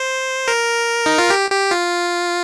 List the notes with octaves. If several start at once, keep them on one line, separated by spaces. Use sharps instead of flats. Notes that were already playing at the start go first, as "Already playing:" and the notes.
Already playing: C5
A#4
D#4
F4
G4
G4
F4